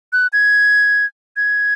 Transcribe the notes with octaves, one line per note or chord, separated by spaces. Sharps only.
F#6
G#6
G#6